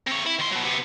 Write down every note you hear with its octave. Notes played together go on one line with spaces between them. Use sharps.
C3 C#5
E4
D#3 C6
B2 F#3
C3 B3